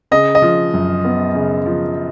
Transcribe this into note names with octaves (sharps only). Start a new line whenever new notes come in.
C#3 D#5
D#5
F3
F#2
B3
C#3
F3